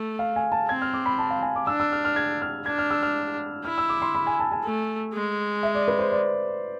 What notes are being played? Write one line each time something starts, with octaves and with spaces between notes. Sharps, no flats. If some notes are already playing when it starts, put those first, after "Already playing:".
Already playing: A3
F5
G#5
A5
C4 G#6
F6
D6
B5
A5
F5
G#5
D6
D4 E6
E6
F6
F6
G#6
F6
D4 G#6
F6
E6
F6
E4 F6
E6
D6
C6
B5
G#5
A5
G#5
A3
G#3
E5
D5
B4
C5
D5